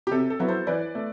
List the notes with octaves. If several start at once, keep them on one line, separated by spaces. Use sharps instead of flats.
G4
C3 A4
A4
F#3 B3 E4
A4 C5
E3 B4 D5
A3